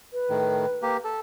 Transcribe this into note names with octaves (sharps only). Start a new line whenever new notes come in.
B4
A2 D#3
A#3 G4
A4